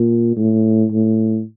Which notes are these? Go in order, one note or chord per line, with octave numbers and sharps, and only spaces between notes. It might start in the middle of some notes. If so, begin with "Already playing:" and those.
Already playing: A#2
A2
A2